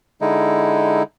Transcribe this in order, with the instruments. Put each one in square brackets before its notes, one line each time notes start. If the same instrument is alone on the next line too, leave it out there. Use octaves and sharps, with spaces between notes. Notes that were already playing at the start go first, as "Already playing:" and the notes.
[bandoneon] D3 G#3 D#4 E4